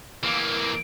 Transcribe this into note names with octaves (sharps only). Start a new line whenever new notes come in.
E3 A#3